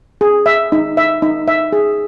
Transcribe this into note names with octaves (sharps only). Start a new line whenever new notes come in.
G#4
E5
D#4
E5
D#4
E5
G#4